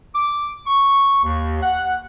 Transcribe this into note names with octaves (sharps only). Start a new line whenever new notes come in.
D6
C#6
D#2
F#5